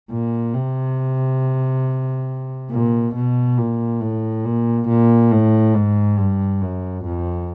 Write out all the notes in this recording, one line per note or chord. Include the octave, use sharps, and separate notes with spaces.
A#2
C3
A#2
B2
A#2
A2
A#2
A#2
A2
G#2
G2
F#2
F2